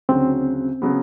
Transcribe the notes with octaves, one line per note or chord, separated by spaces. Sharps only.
D2 C#3 F#3 C4
C#3 F#3 B3